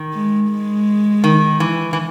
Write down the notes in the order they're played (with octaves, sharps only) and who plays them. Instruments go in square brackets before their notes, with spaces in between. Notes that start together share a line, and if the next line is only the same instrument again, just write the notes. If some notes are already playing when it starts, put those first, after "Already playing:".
Already playing: [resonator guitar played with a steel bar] D#3
[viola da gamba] G#3
G#3
[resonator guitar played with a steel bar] D#3
E3
E3